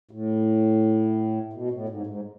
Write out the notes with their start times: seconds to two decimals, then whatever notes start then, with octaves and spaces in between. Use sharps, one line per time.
0.11 A2
1.53 B2
1.71 A2
1.89 G#2
2.07 G#2